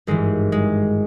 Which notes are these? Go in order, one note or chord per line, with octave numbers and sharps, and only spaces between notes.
G#1 G2 E3 G#3
G#3